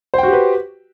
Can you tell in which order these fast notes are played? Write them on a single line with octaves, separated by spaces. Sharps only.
C5 G5 F#4 G4 B4